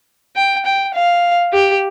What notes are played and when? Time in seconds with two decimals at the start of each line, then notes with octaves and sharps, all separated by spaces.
0.36 G5
0.66 G5
0.95 F5
1.53 G4